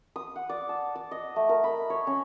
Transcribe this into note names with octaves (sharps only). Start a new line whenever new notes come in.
D#6
F#5
D5
A5
D5
D#5
A3
A#4
B5
C#5
C#4